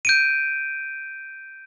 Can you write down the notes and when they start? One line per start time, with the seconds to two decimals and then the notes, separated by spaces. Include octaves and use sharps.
0.05 G6 D7 D#7